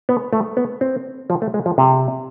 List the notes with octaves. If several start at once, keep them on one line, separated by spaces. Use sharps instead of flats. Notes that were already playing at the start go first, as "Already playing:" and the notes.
B3
A3
B3
C4
F3
A3
G#3
F3
C3